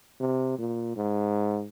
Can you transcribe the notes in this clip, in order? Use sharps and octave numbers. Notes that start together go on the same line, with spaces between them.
C3
A#2
G#2